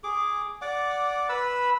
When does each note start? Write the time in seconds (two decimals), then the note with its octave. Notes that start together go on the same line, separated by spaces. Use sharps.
0.04 G#4 D6
0.62 D5 F#5 D6
1.29 B4 B5 E6